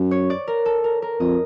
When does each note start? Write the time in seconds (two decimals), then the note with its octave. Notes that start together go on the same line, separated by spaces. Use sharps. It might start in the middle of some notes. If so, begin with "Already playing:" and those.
Already playing: F#2
0.11 C#5
0.30 D5
0.48 A#4
0.66 A4
0.84 A#4
1.02 A#4
1.20 F2 D#5